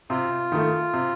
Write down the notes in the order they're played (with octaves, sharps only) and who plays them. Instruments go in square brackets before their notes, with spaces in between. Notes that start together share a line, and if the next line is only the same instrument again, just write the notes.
[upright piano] C3 [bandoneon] F4
[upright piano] D#3 A3
C3